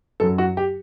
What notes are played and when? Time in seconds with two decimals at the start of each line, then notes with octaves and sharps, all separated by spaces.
0.20 F#2 F#3 A4
0.38 F#4
0.57 G4